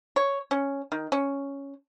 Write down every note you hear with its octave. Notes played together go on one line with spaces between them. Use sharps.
C#5
C#4
D#3
C#4